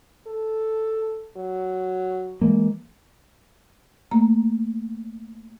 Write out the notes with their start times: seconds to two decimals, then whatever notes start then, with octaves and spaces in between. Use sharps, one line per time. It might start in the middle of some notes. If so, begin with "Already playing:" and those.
0.27 A4
1.37 F#3
2.41 E3 G#3 A#3
4.11 A3 A#3 A#5